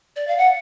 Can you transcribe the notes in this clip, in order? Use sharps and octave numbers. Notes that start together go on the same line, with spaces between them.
D5
F5
F#5